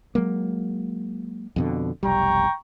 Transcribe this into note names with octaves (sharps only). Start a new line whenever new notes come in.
F#3 G#3 A#3
F2 B2 D3
F1 B1 G3 G5 A#5 C#6